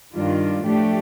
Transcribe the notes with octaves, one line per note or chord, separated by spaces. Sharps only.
G2 D#3 G3 D4 F4
A2 F3 A3 D4 G4